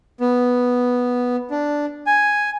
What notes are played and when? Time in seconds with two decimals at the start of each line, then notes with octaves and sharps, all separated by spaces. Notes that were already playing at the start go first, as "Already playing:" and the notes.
0.20 B3
1.51 D4
2.07 G#5